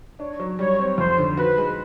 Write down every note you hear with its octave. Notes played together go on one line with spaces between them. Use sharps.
D4 C#5
F#3
G3 C#5
C4
F2 C5
D3
F#4 B4
G#3